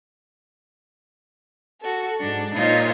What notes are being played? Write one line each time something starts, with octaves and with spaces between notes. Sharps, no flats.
F#4 A4
G#2 D4
A#2 D#4 F4 C5 C#5 D#5